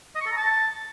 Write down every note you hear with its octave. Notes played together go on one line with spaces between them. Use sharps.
D#5
C#6
A4
A#5
A5